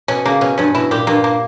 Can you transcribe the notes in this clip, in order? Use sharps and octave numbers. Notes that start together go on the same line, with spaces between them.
B2 C#4
C#3 A#3
B2 C#4
G2 C#4
B2 E4
A#2 G4
G2 A#3
A#3